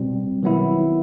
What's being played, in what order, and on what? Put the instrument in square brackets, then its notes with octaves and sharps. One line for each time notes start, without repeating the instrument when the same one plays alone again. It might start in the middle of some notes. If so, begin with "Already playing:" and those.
Already playing: [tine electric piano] B2 G3 C4
D#3 F#3 B3 E4